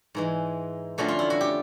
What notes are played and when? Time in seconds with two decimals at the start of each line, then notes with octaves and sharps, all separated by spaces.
0.15 G#2 E3 G#3
0.98 F2 D3 F3 A3 C#4 F#4
1.08 F4
1.19 E4
1.30 F#4
1.41 G4